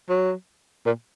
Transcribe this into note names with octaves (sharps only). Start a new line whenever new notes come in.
F#3
A#2